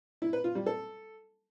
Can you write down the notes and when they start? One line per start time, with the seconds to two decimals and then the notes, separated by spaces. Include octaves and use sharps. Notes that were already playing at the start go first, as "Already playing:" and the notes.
0.22 E4
0.33 B4
0.44 F4
0.55 G3
0.66 A4